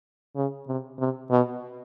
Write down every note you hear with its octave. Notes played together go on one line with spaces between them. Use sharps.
C#3
C3
C3
B2